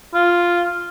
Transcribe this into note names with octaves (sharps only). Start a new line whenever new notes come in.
F4